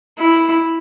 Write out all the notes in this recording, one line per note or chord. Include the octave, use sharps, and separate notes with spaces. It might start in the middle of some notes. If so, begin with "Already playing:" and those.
E4